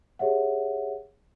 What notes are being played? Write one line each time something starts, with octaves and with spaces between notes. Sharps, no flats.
G4 G#4 C#5 E5 F#5